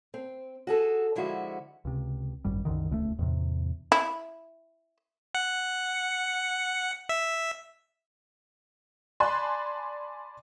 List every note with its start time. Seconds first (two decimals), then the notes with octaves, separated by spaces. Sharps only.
0.14 C4
0.67 F#4 G#4 A4
1.16 D3 F3 G#3 E4 F#4
1.85 C#2 C3
2.45 G#1 F#2 G3
2.65 C2 F#2 D3 D#3
2.89 D#1 C#2 G#3 A3
3.19 E2 A2 C3
3.92 E4
5.35 F#5
7.09 E5
9.20 D5 G#5 A5 B5 C6 F#6